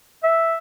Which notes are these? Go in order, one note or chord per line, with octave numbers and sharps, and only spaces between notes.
E5